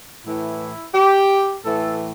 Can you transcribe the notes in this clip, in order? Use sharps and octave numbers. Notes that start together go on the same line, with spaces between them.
A2 E3 E4
G4
A2 E3 A4